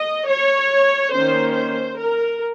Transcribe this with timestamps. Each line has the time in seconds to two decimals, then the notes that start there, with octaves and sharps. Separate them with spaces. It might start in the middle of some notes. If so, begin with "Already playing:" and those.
Already playing: D#5
0.27 C#5
1.13 D#3 A#3 C#4 C5
1.54 C5
1.98 A#4